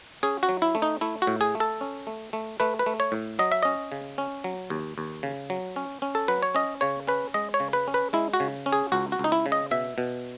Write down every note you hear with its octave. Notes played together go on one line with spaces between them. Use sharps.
C#4 G#4
F#4
F#3
E4
A3
D#4
A3 E4
F#4
A2
G#4
A3
A4
C#4
A3
A3
A3 B4
B4
A3
C#5
A2
F#3 D#5
E5
C#4 D#5
C#3
C#4
F#3
D#2
D#2
C#3
F#3
C#4
C#4
A4
F#3 B4
C#5
C#4 D#5
C#3 C#5
C#4 B4
G#3 D#5
C#5
C#3
B4
C#4
B4
G#3 E4
F#4
C#3
C#4
G#4
C#2 F#4
F#4
C#2 D#4
E4
C#3
D#5
B2 E5
B2